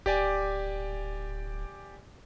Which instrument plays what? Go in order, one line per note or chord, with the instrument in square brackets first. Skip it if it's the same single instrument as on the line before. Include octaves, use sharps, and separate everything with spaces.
[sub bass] D1 [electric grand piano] G4 D5 G#5